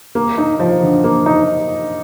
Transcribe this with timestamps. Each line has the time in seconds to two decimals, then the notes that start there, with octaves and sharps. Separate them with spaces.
0.15 A#3
0.38 D#4
0.60 F3
0.83 D3
1.04 A#3
1.26 D#4